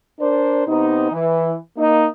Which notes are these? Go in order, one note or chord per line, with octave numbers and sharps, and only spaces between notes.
D4 A#4 C5 D5
C3 B3 D#4
E3
A#3 D#4